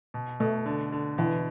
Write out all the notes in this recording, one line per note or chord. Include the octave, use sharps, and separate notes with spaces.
B2
B2 A3
D3
D3
B2 E3